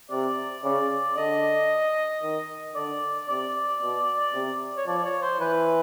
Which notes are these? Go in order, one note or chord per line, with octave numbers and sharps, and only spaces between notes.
C3 D5
C#3 D5
D3 D#5
D#3
D3 D5
C3 D5
B2
C3
C#5
F3 D5
C#5
C5
E3 B4